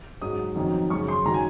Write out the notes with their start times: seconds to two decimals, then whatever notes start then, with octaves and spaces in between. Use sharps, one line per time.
0.22 G#2 F#3 D#6
0.56 F2 D#3 F#3
0.90 F#2 C#3 F#3 C#6
1.08 C6
1.25 D#3 F#3 A#5
1.34 G#5